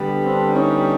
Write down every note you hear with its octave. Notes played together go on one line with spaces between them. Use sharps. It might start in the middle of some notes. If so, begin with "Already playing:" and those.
Already playing: D3 G3 B3
C4 D4
C#4 D#4